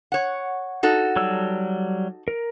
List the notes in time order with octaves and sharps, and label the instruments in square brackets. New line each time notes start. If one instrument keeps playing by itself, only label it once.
[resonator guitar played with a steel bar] C#5 F#5
D#4 F#4 A4
[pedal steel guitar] F#3 G3 E6
A#4